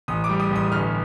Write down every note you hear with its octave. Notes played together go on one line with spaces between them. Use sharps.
A1 D#6
D6
G3
D#6
A1 D#6
G1 F6